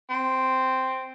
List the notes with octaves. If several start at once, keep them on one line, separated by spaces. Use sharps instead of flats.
C4